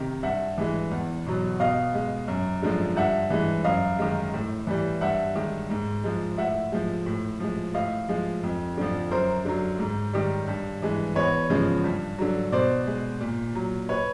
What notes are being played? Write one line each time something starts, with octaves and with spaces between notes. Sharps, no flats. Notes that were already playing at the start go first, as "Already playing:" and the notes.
Already playing: C3 D#3
G2 E5 F#5
E3 G#3
E2
B2 F#3
B2 D#5 F5
G#3
F#2
D3 F3 G#3
G2 E5 F#5
E3 G#3
F#2 D#5 F5
D#3 G#3
A2
E3 G3
G2 E5 F#5
D#3 G#3
G#2
F3 G#3
A2 E5 F#5
F3 G#3
A2
F3 G#3
A2 D#5 F5
F3 G#3
F2
D3 F3
F#2 A#4 C5
D3 F#3
G#2
D#3 G3
G2
E3 G#3
E2 B4 C#5
C#3 F3 G#3
G2
D3 F#3
B2 C5 D5
G#3
A#2
F#3
B4 C#5